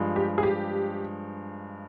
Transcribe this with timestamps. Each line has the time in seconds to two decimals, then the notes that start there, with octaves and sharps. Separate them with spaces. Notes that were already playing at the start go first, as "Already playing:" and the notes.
Already playing: G2 F3 G#3
0.16 G4
0.38 G#4
0.43 G4